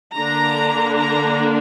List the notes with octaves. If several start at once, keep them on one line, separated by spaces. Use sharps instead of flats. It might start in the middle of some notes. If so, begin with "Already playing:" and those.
D3 A#3 D4 A#5
A#5